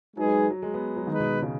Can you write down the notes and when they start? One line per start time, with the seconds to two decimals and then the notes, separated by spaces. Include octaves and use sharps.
0.16 F#3 G#3 D#4 G#4 B4
0.28 F#3
0.50 F#3
0.62 G#3
0.74 B3
0.97 F#3
1.07 D#3 G#3 D#4 B4
1.20 B2
1.42 C#3